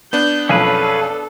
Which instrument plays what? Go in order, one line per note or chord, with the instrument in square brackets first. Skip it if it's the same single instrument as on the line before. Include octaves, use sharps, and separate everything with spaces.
[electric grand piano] B3 D4 [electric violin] G6
[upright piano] B1 F2 [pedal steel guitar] C#4 G#4 B4 [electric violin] A4